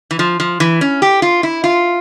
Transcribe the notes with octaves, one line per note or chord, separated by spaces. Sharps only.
E3
F3
F3
E3
C#4
G4
F4
E4
F4